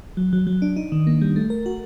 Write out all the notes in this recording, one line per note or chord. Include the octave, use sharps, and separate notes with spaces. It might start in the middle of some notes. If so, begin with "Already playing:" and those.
F#3
F#3
F#3
D4
D#4
D#3
A#3
G3
A3
A#4
F#4